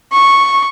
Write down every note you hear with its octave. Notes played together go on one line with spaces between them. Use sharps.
C#6